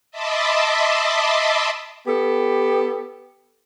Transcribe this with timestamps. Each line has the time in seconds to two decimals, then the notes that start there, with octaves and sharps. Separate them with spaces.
0.11 D#5 E5 A5 B5 C6 D6
2.07 B3 G4 A4